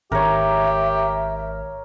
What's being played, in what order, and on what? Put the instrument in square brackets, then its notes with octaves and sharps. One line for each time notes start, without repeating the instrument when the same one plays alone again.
[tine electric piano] G#1 [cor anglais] G4 [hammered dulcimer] A#4 C#5 [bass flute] E5